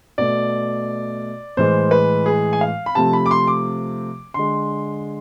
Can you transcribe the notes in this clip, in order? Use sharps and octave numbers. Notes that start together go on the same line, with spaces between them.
B2 A3 D5
A2 E3 G#3 C5
B4
G#4
G#5
F5
B5
C3 F3 A3 A5
B5
D6
C6
D6
D3 G#3 C6